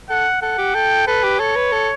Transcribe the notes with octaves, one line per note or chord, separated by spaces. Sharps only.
A4 F#5
A4 F#5
G4
A4 G5
A4 B4
G4
A4 C#5
B4
A4